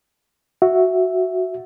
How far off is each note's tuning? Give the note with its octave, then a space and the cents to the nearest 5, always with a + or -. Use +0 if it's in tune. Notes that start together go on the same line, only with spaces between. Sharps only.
F#4 +0 E5 +0